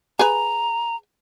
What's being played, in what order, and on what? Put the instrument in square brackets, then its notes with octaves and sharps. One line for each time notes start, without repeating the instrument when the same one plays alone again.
[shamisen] G#4 B4 [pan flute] A#5